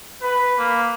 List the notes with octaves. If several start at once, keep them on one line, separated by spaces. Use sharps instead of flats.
B4
A#3